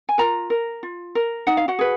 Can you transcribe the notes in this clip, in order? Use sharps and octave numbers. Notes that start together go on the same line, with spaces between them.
G#5
F4 A#4 A#5
A#4
F4
A#4
D#4 F#5
F5
F#4 F#5
G#4 B4